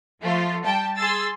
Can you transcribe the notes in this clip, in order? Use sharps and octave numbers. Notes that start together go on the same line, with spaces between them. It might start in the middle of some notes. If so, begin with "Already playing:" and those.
F3 A3 F4
G3 G5 A5
G#4 C6 E6 A6